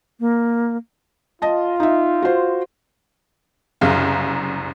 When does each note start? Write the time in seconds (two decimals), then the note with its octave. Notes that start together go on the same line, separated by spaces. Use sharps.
0.20 A#3
1.42 F4 D#5 A5
1.80 D#4 E5
2.22 F#4 C5
3.81 F#1 C2 F#2 F5